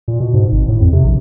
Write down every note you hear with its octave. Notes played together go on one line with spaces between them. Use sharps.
A#2
B2
G#2
G#1
A2
F2
C3
A#1